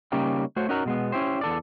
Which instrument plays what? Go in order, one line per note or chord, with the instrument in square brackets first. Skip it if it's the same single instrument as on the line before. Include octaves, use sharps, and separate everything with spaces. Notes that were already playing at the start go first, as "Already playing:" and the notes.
[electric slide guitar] C#3 G3 A#3 C#4 D#4 G4
A3 F#4 C5 C#5
C#4 D#4 F#4 A#4 F#5 A#5
B2 G#3 B3
C#4 E4 G4 C5
E2 A4 D5